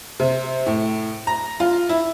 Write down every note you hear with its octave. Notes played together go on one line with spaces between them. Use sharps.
C3
A2
A#5
F4
E4